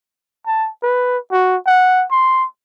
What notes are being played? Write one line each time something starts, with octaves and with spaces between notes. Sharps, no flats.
A5
B4
F#4
F#5
C6